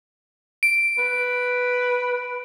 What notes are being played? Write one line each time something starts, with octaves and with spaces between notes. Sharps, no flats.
D7
B4